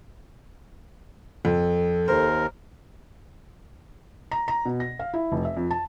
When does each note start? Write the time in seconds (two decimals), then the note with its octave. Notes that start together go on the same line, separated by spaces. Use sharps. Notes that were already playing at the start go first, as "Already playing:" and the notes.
1.45 F2 A4
2.08 D#2 A#4 C5
4.31 A#5
4.48 A#5
4.65 B2
4.80 A#6
4.99 F5
5.13 E4
5.32 F1
5.45 E5
5.57 F2
5.71 A5